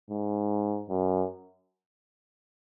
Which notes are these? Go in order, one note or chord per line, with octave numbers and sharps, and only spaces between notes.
G#2
F#2